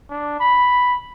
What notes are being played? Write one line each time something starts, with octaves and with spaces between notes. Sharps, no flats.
D4
B5